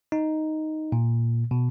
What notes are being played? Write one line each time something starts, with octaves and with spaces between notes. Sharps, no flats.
D#4
A#2
B2